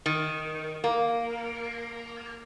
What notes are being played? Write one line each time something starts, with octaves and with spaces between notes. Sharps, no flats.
D#3
A#3